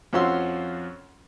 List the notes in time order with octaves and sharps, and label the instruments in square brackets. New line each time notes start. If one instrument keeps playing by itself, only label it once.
[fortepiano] F2 F3 C#4 F#4 C6 E6